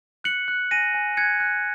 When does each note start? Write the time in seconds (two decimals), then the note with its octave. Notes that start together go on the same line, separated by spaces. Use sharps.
0.24 F#6 C#7 F#7
0.48 F#6
0.71 G#5 A#6 D#7
0.94 G#5
1.17 F#6 G#6 C#7
1.40 F#6